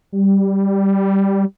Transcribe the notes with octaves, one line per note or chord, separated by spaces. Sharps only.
G3